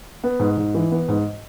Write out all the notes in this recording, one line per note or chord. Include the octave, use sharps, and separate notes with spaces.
B3
G#2
G#2
E3
B3
G#2